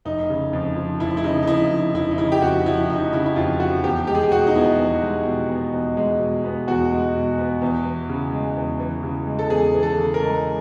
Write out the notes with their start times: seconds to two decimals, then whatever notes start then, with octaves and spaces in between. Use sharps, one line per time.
0.05 F1 D#4
0.30 C#3
0.53 F2
0.76 F3
1.00 F1 E4
1.17 E4
1.24 C#3 D#4
1.43 D#4
1.47 F2 E4
1.71 F3
1.94 F1 E4
2.11 D#4
2.18 C#3 E4
2.32 G4
2.42 F2 F#4
2.66 F3 E4
2.89 F1 D#4
3.13 C#3 E4
3.26 E4
3.36 F2 F4
3.60 F3 F#4
3.83 E2 G4
4.07 G#3 G4
4.15 G#4
4.23 G4
4.32 B2 F#4
4.47 D#4
4.55 B3 E4
4.78 E2
5.02 G#3
5.25 B2
5.49 B3
5.73 E2
5.97 G#3
6.19 B2
6.44 B3
6.67 E2 F#4
6.91 G#3
7.15 B2
7.39 B3
7.62 E2
7.85 E3
8.09 C#3
8.33 G#3
8.57 E2
8.80 E3
9.03 C#3
9.27 G#3
9.39 A4
9.50 E2 G#4
9.74 E3
9.83 A4
9.98 C#3
10.14 A#4
10.22 G#3